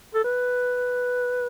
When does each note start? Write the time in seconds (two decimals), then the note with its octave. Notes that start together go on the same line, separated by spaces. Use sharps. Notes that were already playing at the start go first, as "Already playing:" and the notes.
0.15 A4
0.24 B4